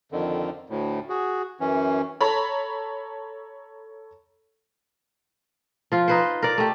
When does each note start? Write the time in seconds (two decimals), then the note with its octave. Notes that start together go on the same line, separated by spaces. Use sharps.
0.12 F2 D3 D#3
0.70 D2 A2
1.09 F#4 G#4
1.60 F#2 E3 C#4
2.21 A4 C#5 A#5 B5
5.92 F3 F4
6.08 D#4 B4 C5
6.42 A#4 D5
6.58 A3 G4